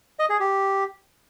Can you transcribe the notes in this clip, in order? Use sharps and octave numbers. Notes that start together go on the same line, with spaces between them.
D#5
G#4
G4